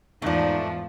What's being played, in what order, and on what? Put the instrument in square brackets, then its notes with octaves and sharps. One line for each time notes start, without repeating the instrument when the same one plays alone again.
[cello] E2 G#2 [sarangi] F3 [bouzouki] A3 D4 [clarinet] D#4